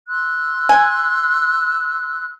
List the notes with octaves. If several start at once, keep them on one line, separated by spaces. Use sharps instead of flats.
C6 E6 F#6
G#5